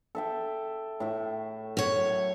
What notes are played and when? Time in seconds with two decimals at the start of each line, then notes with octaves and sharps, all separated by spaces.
0.15 A4 E5 G5
1.00 A2 E5
1.77 F#2 C#5